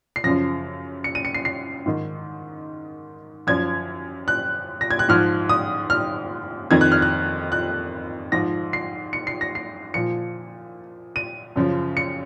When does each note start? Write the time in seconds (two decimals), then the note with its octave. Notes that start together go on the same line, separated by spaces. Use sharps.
0.16 C7
0.24 F#2 C#3 F3 A#6
1.04 C#7
1.15 D#7
1.25 C#7
1.34 C7
1.45 C7
1.86 G#2 D#3
3.47 F#2 F3 G#6
4.28 F#6
4.81 A#6
4.91 G#6
4.99 F#6
5.09 G#2 F3 F6
5.49 D#6
5.90 F6
6.71 F2 D#3 G#6
6.81 F#6
6.92 F6
7.02 F#6
7.52 F#6
8.32 G#2 F3 A#6
8.73 C7
9.13 C#7
9.27 C7
9.41 A#6
9.55 C7
9.94 A#2 F3 C#7
11.16 D#7
11.56 F#2 C#3 F3
11.97 C#7